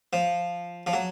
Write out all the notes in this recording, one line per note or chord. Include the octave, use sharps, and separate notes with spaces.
F3
F3
F#3